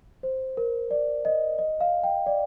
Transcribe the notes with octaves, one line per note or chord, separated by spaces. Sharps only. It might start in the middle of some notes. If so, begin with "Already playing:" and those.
C5
A#4
D5
D#5
D#5
F5
G5
D5